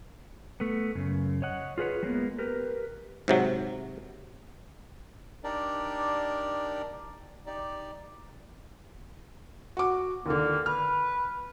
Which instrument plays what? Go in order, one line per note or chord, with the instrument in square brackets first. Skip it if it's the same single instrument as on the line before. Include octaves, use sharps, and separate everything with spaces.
[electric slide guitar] A3 B3
F#2 C#3
C#5 D#5 F#5
F4 G#4 B4 C#5
G3 G#3 A#3 B3
G4 A#4 B4
[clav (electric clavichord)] G#2 C3 F#3
[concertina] D4 D#4 G4 A#4 D5
D#4 G4 D5
[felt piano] F#4 D6
[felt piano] D#2 D3 [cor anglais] A#3
[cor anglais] B4 [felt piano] F6